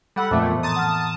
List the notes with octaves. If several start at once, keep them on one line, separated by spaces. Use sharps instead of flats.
G3 A4 F#5 B5 E6
F2 A#2 A3 E5 A5 D6
A2 E3 B3
A5 A#5 C6 D#6
F#5 F6